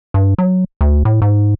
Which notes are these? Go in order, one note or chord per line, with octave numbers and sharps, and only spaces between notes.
G2
F#3
D2
A2
G#2